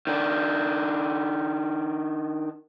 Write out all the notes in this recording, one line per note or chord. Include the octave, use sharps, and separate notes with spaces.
D#3 D4